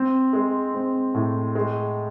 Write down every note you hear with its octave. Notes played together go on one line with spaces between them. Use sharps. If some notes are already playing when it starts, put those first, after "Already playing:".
Already playing: C4
G#3
C4
A2
G#3